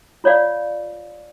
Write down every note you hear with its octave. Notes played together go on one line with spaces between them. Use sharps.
F4 C#5 D5 F5